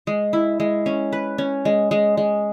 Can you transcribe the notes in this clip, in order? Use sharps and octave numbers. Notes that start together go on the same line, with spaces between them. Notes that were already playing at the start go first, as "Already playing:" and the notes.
G#3
E4
G#3
C#4
B4
C#4
G#3
G#3
G#3